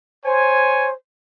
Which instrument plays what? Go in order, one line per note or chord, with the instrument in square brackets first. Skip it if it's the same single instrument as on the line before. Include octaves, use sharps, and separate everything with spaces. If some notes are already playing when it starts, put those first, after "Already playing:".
[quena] C5 [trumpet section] C#5 G#5